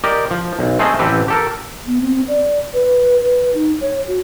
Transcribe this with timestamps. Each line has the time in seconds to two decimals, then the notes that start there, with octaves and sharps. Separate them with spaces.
0.04 G4 A#4 D5 D#5
0.31 F3
0.59 B1
0.79 A3 C4 G#4 C5 D#5 F5
0.99 A1 C4 G4 A4 B4
1.28 G4 A4 A#4
1.87 B3
2.01 C4
2.28 D5
2.74 B4
3.20 B4
3.55 D#4
3.81 C#5
4.08 F#4